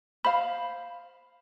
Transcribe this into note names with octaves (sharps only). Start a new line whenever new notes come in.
C5 F5 B5